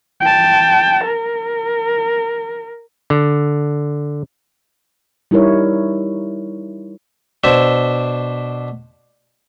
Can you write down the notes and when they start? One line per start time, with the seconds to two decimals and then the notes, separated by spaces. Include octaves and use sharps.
0.21 G5 A5
1.04 A#4
3.10 D3
5.31 G3 D#4 E4 A#4 C#5
7.44 B2 D4 C5 E5 C6